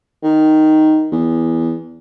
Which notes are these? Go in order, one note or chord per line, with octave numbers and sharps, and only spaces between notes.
D#3
E2